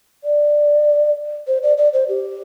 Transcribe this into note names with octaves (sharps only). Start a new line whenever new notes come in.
D5
C5
D5
D5
C5
G4